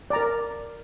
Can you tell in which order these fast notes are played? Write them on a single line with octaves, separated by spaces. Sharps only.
D5 A#5 A#4